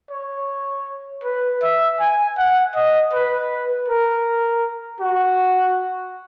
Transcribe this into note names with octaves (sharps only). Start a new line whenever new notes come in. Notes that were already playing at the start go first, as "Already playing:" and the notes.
C#5
B4
E5
G#5
F#5
D#5
B4
A#4
F#4